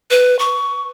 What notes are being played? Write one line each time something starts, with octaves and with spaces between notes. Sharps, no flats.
B4
C#6